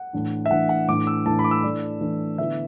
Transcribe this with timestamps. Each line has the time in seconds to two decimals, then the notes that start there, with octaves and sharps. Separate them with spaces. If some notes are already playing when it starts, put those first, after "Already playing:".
Already playing: F#5
0.13 A2 E3 D4
0.46 E5
0.51 A2 E3 D4 F#5
0.69 F#5
0.88 A2 E3 D4 D6
1.07 E6
1.25 A2 E3 D4 A5
1.39 B5
1.44 D6
1.51 E6
1.63 E3 A3 D4 D5
2.01 E3 A3 D4
2.38 D3 B3 E4 E5